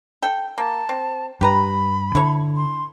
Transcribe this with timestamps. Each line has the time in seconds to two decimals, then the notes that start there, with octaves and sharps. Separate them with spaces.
0.22 A4 G5
0.58 A#3 A5
0.89 C4
1.41 G2 G4 B4 A#5 B5
2.15 D3 E4 A4 C#5
2.56 C6